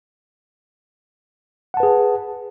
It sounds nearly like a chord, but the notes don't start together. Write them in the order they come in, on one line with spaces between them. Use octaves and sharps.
F#5 A5 B4 G#4